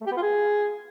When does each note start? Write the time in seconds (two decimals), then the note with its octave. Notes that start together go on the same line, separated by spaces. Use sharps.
0.01 A3
0.06 G4
0.12 B3
0.17 F4
0.22 G#4